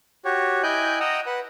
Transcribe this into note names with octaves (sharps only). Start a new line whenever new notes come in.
F#4 G4 C#5
E4 D#5 G5 G#5 F#6 G6
D#5 F#5 G5 A#5 D#6 E6
B4 F#5